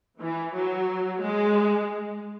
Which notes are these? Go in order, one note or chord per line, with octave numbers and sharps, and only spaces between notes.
E3
F#3
G#3